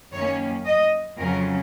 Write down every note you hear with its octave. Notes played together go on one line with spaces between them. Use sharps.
F#2 D#3 A#3 C#4 C#5
D#5
F2 C#3 F#3 C#4 A#4